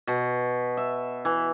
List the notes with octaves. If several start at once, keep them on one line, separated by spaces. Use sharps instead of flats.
B2
E5
E3